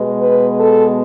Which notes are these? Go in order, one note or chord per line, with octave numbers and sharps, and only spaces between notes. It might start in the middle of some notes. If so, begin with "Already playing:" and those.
Already playing: B2 G#3 B3
B4
A4